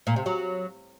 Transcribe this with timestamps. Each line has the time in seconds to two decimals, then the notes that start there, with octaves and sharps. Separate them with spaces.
0.07 A#2
0.16 C3
0.26 F#3